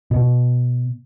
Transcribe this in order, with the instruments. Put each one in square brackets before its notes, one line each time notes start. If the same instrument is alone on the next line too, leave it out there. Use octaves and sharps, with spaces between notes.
[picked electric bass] B2